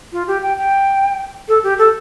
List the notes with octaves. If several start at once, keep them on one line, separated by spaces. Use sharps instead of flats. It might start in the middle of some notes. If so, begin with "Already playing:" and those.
F4
G4
G5
G5
A4
G4
A4